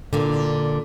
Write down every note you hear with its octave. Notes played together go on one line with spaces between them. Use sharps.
A#2 D3